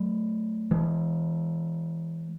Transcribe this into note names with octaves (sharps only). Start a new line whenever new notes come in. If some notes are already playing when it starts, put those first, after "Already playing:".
Already playing: F#3 A3
E3 G#3